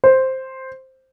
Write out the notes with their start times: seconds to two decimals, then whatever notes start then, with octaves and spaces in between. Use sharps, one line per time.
0.04 C5